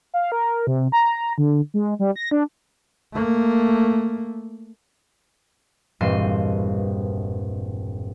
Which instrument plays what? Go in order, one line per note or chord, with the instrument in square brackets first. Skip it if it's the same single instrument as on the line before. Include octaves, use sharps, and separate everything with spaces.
[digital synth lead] F5
A#4
C3
A#5
D3
G#3
G3
A#6
D4
[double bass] A3 A#3
[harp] E1 G2 A#2 C4 D#5 C7